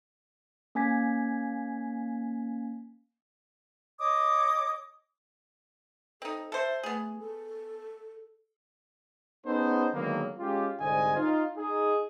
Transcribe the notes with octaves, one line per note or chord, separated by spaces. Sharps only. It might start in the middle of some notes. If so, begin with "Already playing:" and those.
A#3 C#4 G#5 G#6 B6
C#5 D#5 D6 D#6
C4 D#4 A4
A4 C5 E5
A3 B3 G#4
A4
B3 C#4 D#4 G#4 A4 C5
D3 D#3 F#3 G#3 A#3 B3
G#3 C#4 F4 G4
C2 G#2 D3 C5 D#5 G#5
D#4 F4
D#4 G#4